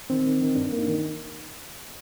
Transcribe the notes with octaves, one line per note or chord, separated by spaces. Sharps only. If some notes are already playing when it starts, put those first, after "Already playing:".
D#3 C4
D#3
D#3
G2 D4
A#3
D#4
D#3